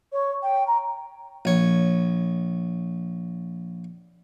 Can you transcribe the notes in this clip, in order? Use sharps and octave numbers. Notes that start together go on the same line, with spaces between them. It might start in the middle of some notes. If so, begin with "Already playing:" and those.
C#5
G5
A#5
A#1 C#5